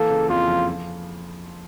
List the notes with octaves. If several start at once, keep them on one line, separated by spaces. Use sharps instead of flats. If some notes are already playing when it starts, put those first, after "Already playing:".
Already playing: E3 A#3 A4
C#3
F2 F4
F3
F3